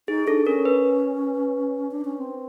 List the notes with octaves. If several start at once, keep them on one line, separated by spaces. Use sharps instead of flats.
D#4 G#4
D4 A4
C#4 A#4
B4
D4
C#4
C4